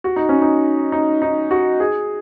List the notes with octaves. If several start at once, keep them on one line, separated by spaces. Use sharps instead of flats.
F#4
D#4
C#4
D#4
D#4
D#4
F#4
G#4